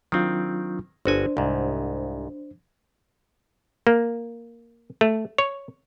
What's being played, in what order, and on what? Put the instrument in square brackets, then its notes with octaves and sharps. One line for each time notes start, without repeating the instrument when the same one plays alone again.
[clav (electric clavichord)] D#3 C4 [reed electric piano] F#3 D4 F4
[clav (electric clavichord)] G1 F#4 G#5 [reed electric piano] D4 C5
[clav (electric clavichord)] C2 G#2
A#3
A3
C#5